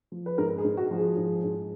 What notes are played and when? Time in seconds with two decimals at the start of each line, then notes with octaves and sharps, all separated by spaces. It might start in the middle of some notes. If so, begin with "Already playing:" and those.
0.12 F3
0.26 B4
0.38 G#2 A#4
0.58 G#4
0.65 G#2
0.77 F#4
0.91 F3
0.98 G#4
1.17 G#2
1.44 G#2